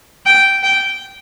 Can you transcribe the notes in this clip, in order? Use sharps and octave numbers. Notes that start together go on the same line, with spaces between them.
G5
G5